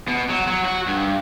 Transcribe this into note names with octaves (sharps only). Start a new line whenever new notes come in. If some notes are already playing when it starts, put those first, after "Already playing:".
B2
F#3
F#3
F#4
G2